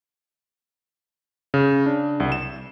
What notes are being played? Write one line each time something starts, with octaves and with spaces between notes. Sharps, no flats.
C#3
D4
C2
E7